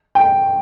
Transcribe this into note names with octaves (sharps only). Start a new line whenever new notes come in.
G5